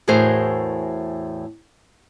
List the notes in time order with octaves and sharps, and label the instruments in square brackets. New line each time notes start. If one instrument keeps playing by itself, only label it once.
[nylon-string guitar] E2 A2 F#4 G#4 A#4 C5